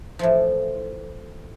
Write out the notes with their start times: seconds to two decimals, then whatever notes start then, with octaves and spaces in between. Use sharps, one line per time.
0.19 A2 E3 F3